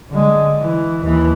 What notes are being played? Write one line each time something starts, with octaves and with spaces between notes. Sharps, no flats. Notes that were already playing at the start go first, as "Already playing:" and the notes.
D3 G#3
E3
D#2 E3